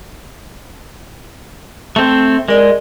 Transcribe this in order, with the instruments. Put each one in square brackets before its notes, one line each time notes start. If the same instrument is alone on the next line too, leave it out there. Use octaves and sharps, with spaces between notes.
[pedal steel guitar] A3 C4
[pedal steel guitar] G#3 [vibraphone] A#4 D5